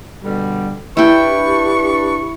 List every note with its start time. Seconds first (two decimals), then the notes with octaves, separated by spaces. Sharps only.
0.23 B2 D3 G3
0.97 D4 E4 G4 B4 G5 C#6